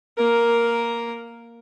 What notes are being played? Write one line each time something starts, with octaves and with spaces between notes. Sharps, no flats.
A#3 A#4